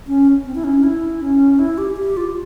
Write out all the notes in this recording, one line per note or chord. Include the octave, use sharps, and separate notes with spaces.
C#4
C4
E4
C#4
E4
C#4
E4
G4
G4
F4